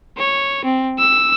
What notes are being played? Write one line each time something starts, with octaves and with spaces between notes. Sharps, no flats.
C#5
C4
E6